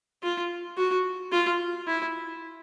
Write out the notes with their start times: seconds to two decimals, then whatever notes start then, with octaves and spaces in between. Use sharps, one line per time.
0.23 F4
0.77 F#4
1.32 F4
1.87 E4